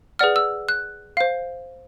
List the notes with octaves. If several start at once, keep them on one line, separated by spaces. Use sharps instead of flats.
G#4 B4 D5 F#5 F6
E6
F#6
C5 F5